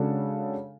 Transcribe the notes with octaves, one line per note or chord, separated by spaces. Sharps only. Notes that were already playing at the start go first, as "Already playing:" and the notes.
Already playing: C#3 G#3 D4 F#4 A4